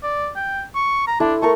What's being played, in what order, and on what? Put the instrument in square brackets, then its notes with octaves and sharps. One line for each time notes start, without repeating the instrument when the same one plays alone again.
[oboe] D5
G5
C#6
A#5
[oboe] D4 [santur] E4 A4 C6
[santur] A3 A4 A#4 [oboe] C#6